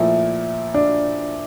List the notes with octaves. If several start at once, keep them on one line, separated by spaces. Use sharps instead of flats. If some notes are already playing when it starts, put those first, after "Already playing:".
Already playing: A#2 F3 A3 E4
D4